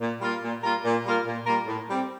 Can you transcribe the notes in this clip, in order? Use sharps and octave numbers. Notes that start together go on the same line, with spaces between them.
A#2
G3 A#3 F4 A#4
A#2
G3 A#3 F4 A#4
A#2
G3 A#3 F4 A#4
A#2
G3 A#3 F4 A#4
A2
G3 C4